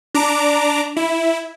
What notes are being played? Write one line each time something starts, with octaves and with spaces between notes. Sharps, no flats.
D4 A#5 D6
E4